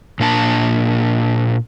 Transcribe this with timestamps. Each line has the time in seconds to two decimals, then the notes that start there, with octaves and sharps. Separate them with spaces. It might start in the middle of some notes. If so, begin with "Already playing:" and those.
0.20 A#2 A#3 D4 A5